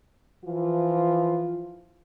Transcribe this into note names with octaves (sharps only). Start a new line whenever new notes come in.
E3 F3 F4